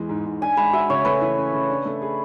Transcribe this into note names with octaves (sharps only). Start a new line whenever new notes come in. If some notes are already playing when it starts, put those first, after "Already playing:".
Already playing: E2 E3 G#3
G#2
G#2
D4 G#5
G#3 B5
F#4 E5
C#3 C#5
A3 B4
E3
C#4
C#3
D4
A3
G#4